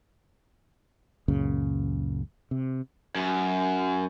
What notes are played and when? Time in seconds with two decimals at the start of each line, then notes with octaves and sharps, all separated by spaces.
1.28 C#2 F#2 A#2 C#3
2.51 C3
3.15 F#2